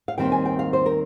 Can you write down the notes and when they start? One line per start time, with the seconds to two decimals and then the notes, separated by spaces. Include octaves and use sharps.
0.08 F5
0.18 D#2 D#3 G3 C4 G5
0.32 G#5
0.45 G5
0.59 F5
0.73 C5
0.86 A#4